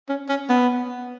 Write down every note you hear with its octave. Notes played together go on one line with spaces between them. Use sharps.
C#4
C#4
B3